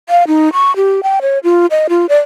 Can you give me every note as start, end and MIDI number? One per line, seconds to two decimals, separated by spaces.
0.09 0.24 77
0.27 0.49 63
0.53 0.74 85
0.76 1.03 67
1.03 1.20 79
1.22 1.39 73
1.43 1.66 65
1.71 1.87 75
1.89 2.06 65
2.09 2.19 74